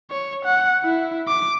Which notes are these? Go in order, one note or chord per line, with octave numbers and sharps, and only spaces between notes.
C#5
F#5
E4
D6